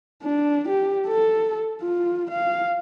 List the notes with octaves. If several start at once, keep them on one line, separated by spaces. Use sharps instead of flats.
D4
G4
A4
F4
F5